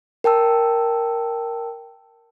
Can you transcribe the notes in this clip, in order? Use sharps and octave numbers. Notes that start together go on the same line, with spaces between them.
A#4 G5 A5 E6